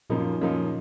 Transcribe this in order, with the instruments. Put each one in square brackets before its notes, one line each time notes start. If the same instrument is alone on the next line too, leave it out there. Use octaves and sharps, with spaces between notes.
[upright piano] F#2 C#3 F3 A#3 D#4 [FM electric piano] A#2
[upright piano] F#2 C#3 F3 A#3 D#4